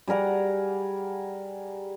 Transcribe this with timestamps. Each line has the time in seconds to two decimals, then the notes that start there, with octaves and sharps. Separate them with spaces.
0.08 G3 G#4 A#4 F#5